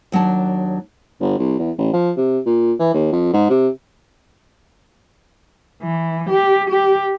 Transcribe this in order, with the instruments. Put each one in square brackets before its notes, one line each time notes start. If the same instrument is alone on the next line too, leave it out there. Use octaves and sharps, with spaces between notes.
[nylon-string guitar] D#2 F#3 D4 A5
[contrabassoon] G1
C2
E2
A1
F3
C3
A#2
E3
D#2
F2
G#2
C3
[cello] E3
G4
G4